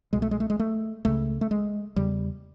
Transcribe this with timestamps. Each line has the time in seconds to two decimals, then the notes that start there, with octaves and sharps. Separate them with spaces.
0.13 C2 B2 G#3
0.22 A3
0.31 G#3
0.40 A3
0.50 G#3
0.59 A3
1.05 C#2 C#3 A3
1.41 A3
1.51 G#3
1.96 E2 C#3 G3